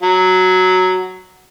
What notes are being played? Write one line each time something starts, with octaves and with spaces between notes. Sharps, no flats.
F#3